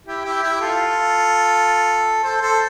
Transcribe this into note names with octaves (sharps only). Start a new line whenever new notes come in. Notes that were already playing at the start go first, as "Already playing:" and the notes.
E4 G4
E4 G4
E4 G4
F4 A4
A4 C5
A4 C5